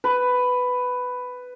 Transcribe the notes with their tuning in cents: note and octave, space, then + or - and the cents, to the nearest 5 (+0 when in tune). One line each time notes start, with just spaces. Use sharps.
B4 +10